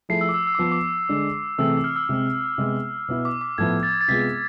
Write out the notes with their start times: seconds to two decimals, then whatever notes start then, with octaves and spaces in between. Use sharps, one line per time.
0.09 F3 A3 E4 G#4 C7
0.21 E6
0.29 D6
0.34 E6
0.47 E6
0.55 D6
0.58 F3 B3 F4
0.72 D6
1.09 D3 G#3 D4
1.58 C3 E3 A3 C4 G#4 E6
1.84 F6
1.96 E6
2.09 C3 G#3 C4
2.58 C3 G#3 B3
3.08 B2 B3 E4
3.25 D6
3.41 D6
3.58 A2 F3 B3 E4 G#6
3.83 A6
4.01 A6
4.08 C3 G#3 B3 F4 G#4 B6